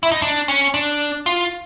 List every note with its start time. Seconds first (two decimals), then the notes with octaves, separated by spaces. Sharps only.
0.03 E4
0.11 D#4
0.22 D4
0.48 C#4
0.74 D4
1.26 F4